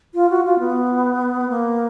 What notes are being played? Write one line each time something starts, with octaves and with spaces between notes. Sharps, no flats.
F4
F#4
F4
B3
A#3